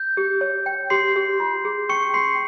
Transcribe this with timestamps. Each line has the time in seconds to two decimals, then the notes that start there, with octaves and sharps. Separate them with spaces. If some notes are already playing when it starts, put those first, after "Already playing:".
Already playing: G6
0.17 G4
0.41 C#5
0.66 G5
0.90 G4 C6 C7
1.16 G4
1.40 F4
1.65 G#4
1.89 C#4 C#6 C#7
2.14 C#4 C6 C7